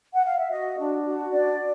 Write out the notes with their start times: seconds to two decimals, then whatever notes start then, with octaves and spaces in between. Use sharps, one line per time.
0.13 F#5
0.26 F5
0.38 E5
0.50 F#4 D#5
0.78 D4
1.06 F#4
1.33 D4 D5